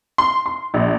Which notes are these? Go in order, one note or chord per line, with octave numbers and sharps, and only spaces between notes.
C6
C6
A#1